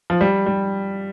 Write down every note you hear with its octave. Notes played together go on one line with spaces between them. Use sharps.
F3
G3
G3